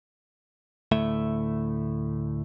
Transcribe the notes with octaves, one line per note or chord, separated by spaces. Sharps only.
D2 A2 A3 E5